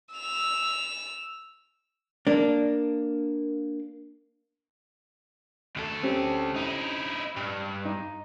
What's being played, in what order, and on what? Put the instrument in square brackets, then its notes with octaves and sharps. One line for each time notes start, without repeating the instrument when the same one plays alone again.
[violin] E6 F7
[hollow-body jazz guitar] A#3 D4
[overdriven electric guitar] D2 A4
[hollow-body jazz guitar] C4 C#4 G4
[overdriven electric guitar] D#4 E4
G2
[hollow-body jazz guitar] D#4